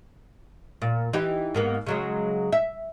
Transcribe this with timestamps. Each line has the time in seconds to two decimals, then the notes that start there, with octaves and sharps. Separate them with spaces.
0.82 A#2
1.13 E3 D#4 G4
1.55 G#2 A#3 B3
1.86 C#3 F#3 G#3
2.52 E5